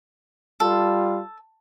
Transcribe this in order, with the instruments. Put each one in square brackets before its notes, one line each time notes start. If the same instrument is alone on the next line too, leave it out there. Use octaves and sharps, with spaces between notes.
[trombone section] G3 F4 [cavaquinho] A4